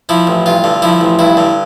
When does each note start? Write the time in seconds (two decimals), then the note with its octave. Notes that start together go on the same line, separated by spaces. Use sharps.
0.09 F3 E4
0.27 A1
0.46 G2 F4
0.64 D3
0.82 F3 E4
1.01 A1
1.19 G2 E4
1.37 D3